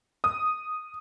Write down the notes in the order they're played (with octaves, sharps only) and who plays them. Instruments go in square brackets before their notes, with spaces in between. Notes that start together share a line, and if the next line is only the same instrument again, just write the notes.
[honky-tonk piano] D#6